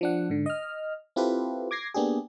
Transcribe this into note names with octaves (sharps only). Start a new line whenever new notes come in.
F3 D4 F#5
G#2 D3
D#5 F6
C4 E4 F4 G4 A4 B4
D6 G#6 A#6 C7
A#3 B3 D4 G4 G#4